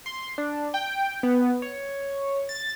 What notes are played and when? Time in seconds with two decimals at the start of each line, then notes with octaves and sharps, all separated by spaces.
0.06 C6
0.38 D4
0.74 G5
1.23 B3
1.62 C#5
2.49 A6